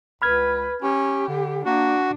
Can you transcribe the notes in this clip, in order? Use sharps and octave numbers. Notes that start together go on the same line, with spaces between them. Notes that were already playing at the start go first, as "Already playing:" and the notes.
C#2 B4 B5 F6 G#6
C#4 G4
D3
A#3 D4 F#4